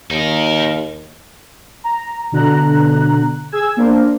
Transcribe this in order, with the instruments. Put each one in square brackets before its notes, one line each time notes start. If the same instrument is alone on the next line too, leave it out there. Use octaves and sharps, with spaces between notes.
[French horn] D#2 [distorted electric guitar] D#4 A#4
[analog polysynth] A#5
B2 D3 A#5 F#6
G#4 E6 G#6
A#3 D4 A#4 C5